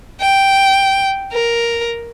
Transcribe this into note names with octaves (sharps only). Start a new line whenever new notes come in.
G5
A#4